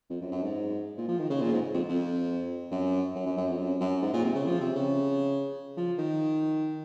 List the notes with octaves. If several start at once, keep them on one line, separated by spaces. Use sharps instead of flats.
F2
F#2
F#2
G#2
A#2
F3
D#3
C#3
A#2
G#2
F2
F2
F#2
F#2
F#2
F#2
F2
F#2
F#2
G#2
A#2
C3
C#3
F3
C3
C#3
F3
D#3